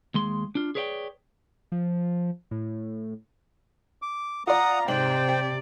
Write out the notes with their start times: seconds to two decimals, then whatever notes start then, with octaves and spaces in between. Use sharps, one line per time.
0.14 D#2 G#3 C6
0.55 D4 F4
0.75 G#4 B4 C#5 D5 F5 G5
1.72 F3
2.51 A2
4.02 D6
4.47 F4 D5 F#5 A#5 D#6
4.88 G#2 C3 C5 D5 G5 F#7
5.29 G4